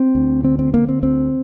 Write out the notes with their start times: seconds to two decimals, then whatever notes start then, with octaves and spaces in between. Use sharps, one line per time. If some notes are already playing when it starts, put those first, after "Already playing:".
Already playing: C4
0.15 D2
0.44 D3 C4
0.59 C4
0.73 D3 A#3
0.89 C4
1.03 D2 C4